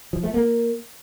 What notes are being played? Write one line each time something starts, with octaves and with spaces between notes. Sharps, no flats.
F3
A3
A#3